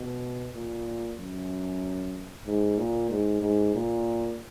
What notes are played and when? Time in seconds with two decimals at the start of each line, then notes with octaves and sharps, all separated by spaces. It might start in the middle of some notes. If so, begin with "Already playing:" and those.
Already playing: B2
0.54 A#2
1.18 F#2
2.46 G#2
2.78 A#2
3.10 G#2
3.42 G#2
3.74 A#2